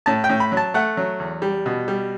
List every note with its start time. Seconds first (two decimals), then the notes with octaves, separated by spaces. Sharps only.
0.06 A2 A5
0.24 G5
0.29 A2
0.40 B5
0.52 F#3
0.57 A5
0.74 A3 F#5
0.97 F#3
1.20 E2
1.42 G3
1.66 B2
1.88 G3